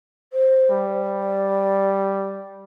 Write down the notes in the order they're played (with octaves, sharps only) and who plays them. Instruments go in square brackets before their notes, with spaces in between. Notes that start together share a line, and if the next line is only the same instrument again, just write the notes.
[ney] C5
[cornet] G3
[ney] D5